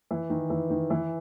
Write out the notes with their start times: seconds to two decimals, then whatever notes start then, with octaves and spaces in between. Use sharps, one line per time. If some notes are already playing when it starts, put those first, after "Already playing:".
0.11 E3
0.30 D#3
0.50 E3
0.70 D#3
0.90 E3